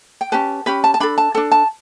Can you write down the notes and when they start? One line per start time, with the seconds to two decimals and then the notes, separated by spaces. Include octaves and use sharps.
0.21 G5
0.32 C#4 G4 B4 A5
0.66 C#4 G4 B4 B5
0.84 A5
0.94 A5
1.00 D4 A4 B5
1.18 A5
1.35 D4 A4 A5
1.51 A5